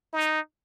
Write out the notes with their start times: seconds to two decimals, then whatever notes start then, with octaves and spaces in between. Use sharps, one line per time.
0.13 D#4